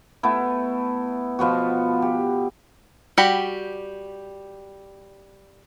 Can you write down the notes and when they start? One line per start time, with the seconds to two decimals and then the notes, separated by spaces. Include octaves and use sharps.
0.23 A3 B3 E4
1.39 B2 F3 B3 F#4
2.02 G4
3.18 G3 F#4 G4 B5